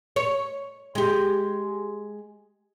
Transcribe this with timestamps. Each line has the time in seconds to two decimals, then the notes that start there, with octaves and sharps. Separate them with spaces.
0.16 C#5
0.95 G#3 G4